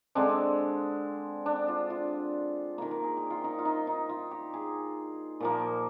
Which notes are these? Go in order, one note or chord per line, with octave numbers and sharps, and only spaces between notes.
D3 G#3 C4 D4
D4
F4
F4
D#3 A#3
A#4
G#4
G4
F4
D#4
F4
D#4
D#4
F4
G4
G#4
A#2 F3 A#3